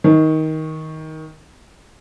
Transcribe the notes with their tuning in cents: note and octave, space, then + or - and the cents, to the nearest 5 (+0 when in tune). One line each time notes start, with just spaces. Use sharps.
D#3 +15